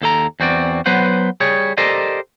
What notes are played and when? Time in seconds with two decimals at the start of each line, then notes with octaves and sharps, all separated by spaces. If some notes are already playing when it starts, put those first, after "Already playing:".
0.02 D#2 A4 A#5
0.40 E2 C4 F#4 D5
0.86 F#3 B3 B4 C5 F#5
1.40 G3 G#4 C#5
1.77 G4 A4 A#4 C5 D5 D#5